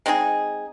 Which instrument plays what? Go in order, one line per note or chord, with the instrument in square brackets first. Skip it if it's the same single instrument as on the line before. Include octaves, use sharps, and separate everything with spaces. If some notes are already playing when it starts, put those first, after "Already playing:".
[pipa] G#3 C4 D#4 G#4